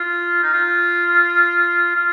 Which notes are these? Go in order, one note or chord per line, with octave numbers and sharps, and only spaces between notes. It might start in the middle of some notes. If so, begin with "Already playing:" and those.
Already playing: F4
D#4
F4
F4